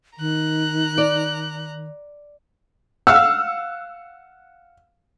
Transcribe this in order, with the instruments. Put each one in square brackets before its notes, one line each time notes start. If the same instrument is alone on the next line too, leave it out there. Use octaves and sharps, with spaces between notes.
[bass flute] D#3 [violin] A#5 F#6
[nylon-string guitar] D5
[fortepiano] F5 F#5 [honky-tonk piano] E6